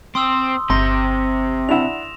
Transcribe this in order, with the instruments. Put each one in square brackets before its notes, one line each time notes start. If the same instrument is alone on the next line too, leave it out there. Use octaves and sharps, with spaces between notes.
[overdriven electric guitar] C4 [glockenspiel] C6 D#6 E6
[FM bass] G1 [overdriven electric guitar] C3 G5 [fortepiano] C6 [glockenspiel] A#6
[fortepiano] D4 E4 F#5 [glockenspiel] E7 F7